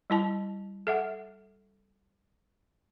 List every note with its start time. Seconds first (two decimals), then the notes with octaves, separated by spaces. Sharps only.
0.10 G3 E4 A5
0.87 A4 E5 F#5